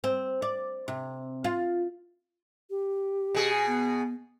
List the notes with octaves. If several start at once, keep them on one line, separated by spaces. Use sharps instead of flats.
C4
D5
C3
F4
G4
B2 G#4
B3